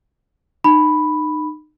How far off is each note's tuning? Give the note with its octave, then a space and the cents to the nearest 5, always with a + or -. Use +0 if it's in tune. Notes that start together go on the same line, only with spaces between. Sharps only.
D#4 -30 B5 +0